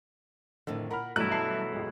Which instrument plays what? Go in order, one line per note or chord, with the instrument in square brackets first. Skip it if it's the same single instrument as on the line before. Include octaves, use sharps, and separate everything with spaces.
[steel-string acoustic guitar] F2 A2 D#3 [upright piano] D3
[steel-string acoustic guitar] A#2 A#4 F#5 [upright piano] A#5 B5 F6
[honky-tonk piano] G2 E3 A#5 [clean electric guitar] B2 F#3 E4 [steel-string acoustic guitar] A3 [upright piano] F#6
[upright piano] E5 A5 C7
[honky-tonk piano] C#2 F#2 [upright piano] G#3